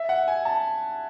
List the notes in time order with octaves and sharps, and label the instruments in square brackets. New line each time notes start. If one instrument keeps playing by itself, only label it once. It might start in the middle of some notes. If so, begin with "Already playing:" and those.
Already playing: [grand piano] E5
F#5
G#5
A5